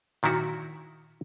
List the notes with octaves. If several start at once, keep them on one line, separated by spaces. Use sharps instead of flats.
A#2 D#3 F#3 E4 F#4